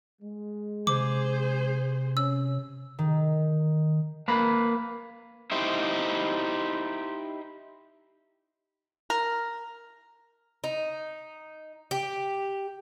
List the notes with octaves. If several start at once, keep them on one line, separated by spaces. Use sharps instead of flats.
G#3
C3 G#4 C5 D6
C#4 E6
D#3
A#3 B4 B5
D#4 E4 G4 C5
A#4
D#4
G4